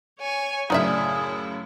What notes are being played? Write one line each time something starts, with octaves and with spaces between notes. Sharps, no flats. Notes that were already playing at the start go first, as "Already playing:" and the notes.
C#5 G#5 C#6
F#2 A2 C#3 D#4 E4 G#4 D5 E5